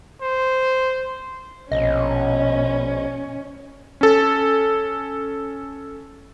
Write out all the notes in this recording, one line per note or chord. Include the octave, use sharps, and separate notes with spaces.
C5
A#1 B2 C#4 D#5
C#4 A4